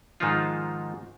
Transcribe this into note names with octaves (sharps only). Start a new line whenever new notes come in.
G#2 D#3 F3 G#3 D#4 F4